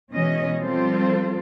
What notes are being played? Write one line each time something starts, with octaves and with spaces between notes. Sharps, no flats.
B2 E3 G#3 C#4 D#5
F3 G3 C4 F4 A4 C5